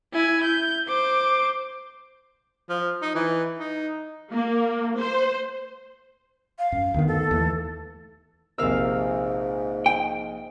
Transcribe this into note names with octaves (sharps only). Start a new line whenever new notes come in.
E4 G#5
G6
C5 D6
F3
D#4
E3
D#4
A#3
C5
F5
F#2
D2 D#3 B3
A4
D#2 E3 A3
A#1 G#2 C3 A#4 F5 E6
G5